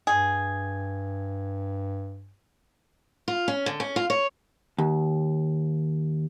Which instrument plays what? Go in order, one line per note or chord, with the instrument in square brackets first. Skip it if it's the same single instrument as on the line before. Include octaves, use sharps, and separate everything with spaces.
[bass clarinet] G2 [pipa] G#4
[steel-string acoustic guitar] F4
C#4
D3
C#4
F4
C#5
[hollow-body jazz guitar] D#2